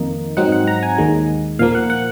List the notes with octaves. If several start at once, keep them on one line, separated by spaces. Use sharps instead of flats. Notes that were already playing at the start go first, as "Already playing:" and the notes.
Already playing: F2 D#3 A#3 D#4
G#2 F#3 C4 D#4 F#5
F#5
A#5
G#5
D#2 D#3 G#3
A#2 F3 A#3 F5
F#5
F#5